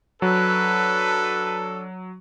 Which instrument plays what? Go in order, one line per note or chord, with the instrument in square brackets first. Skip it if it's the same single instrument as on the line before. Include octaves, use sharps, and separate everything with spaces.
[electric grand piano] F#3 [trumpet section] D4 A4 [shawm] B4